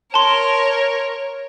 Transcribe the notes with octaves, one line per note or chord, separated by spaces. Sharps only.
A#4 C#5 A5 C6